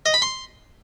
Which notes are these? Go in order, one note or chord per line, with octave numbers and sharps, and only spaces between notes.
D#5
B5
C6